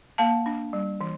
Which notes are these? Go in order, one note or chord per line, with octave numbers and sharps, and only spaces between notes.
A#3 F5 A5
D4
G3
E3